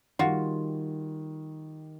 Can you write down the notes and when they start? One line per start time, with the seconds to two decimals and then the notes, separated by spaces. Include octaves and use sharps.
0.19 D#3 G3 F4 F#4